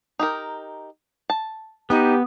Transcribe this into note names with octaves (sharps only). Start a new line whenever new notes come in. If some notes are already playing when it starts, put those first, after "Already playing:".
D#4 G4 A#4
A5
B3 D#4 G4